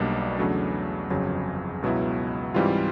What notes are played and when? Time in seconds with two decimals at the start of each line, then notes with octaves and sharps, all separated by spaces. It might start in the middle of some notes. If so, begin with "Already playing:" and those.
Already playing: B1 B2 G3 A#3 D4
0.38 E2 C#3 F#3 A3 D4
1.10 G1 F2 C#3 F#3
1.82 C#2 B2 F#3 B3 E4
2.54 G#2 E3 G3 C4 F4